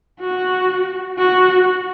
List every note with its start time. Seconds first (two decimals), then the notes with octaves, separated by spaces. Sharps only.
0.20 F#4
1.18 F#4